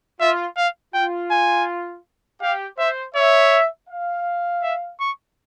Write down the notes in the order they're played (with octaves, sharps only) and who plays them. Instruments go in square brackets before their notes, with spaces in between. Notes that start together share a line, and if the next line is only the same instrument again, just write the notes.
[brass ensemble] F4 [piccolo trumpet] E5
[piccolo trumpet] F5
[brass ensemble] F4 [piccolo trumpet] G5
[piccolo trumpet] G#5
[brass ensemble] G4 [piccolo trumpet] F5
[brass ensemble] C5 [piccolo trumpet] E5
[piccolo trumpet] C#5 [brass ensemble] E5
[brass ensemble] F5
[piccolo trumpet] E5
C#6